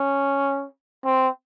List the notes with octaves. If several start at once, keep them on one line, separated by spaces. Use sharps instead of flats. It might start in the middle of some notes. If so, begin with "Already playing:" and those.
Already playing: C#4
C4